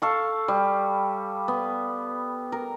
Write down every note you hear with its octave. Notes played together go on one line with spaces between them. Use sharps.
A4 F5 C#6
G3
B3
A#4